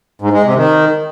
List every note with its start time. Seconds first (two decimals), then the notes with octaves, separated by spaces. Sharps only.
0.22 G#2
0.33 G#3
0.44 C3
0.56 D#3